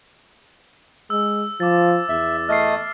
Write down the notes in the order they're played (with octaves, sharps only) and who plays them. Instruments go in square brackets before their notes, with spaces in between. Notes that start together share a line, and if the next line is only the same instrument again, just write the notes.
[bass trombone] G#3 [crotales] E6
[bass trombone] F3 [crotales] D6 A6
[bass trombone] E2 [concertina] E5
[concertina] A3 D#5 [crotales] F6 A6 C7